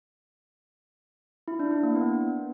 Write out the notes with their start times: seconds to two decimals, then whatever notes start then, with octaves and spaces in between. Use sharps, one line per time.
1.48 E4
1.59 D4
1.71 E4
1.83 A#3
1.95 B3